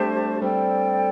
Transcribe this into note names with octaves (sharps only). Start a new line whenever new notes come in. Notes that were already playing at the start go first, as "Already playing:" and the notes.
Already playing: G3 A3 C4 D4 G4 C5 A5
G3 C4 A4 D5 G5